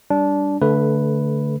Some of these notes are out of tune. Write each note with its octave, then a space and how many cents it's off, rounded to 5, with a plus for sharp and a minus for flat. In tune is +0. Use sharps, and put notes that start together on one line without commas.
G3 +0 D4 -15
D3 -20 A3 +0 B4 +0